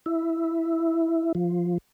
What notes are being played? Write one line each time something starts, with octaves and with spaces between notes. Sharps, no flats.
E4
F3